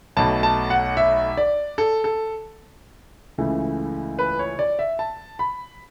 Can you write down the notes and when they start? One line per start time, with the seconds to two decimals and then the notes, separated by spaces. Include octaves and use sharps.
0.17 B1 B2 A3 A5
0.43 A5
0.70 F#5
0.97 E5
1.37 D5
1.78 A4
2.04 A4
3.38 C#2 C#3 E3 A3
4.19 B4
4.39 C#5
4.59 D5
4.79 E5
4.99 A5
5.39 B5